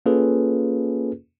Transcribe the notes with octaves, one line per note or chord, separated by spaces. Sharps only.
A#3 C#4 F4 G#4 A4 B4